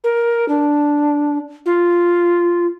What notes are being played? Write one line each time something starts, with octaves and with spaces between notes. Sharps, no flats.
A#4
D4
F4